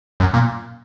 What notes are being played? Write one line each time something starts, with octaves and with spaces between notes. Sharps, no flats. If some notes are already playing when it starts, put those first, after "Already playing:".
F#2
A#2